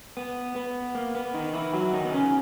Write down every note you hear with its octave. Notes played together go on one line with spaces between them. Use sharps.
B3
B3
A#3
B3
D#3 D#4
E3 E4
F#3 F#4
D#3 D#4
B3
C#3 C#4